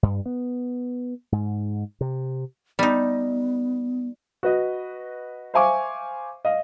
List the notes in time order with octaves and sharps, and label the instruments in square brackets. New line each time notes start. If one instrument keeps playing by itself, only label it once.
[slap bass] G2
B3
G#2
C3
[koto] G3 D#4 [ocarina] B3
[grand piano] F#4 B4 D#5
C5 E5 F5 G#5 C#6 D6
D#5 F5